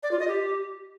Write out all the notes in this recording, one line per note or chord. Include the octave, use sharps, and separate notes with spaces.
D5
F4
D#5
G4